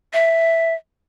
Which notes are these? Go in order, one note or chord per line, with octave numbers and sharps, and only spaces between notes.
E5